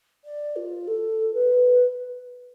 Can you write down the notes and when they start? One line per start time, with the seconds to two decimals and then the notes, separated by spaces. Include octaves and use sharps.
0.24 D5
0.56 F4
0.87 A4
1.34 B4